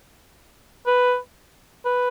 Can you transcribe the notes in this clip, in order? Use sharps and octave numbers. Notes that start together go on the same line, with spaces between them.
B4
B4